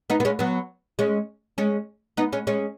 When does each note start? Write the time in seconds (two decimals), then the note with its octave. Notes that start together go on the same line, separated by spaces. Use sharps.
0.10 B3 D#4
0.20 B3
0.25 G#3 C#4
0.39 F#3 B3
0.99 G#3 C#4
1.58 G#3 C#4
2.17 B3 D#4
2.33 G#3 C#4
2.47 G#3 C#4